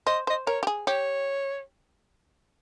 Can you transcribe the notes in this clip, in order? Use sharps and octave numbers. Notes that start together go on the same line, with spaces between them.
C5 D#5
C5 D#5
A#4 C#5
G4
G#4
G4 C#5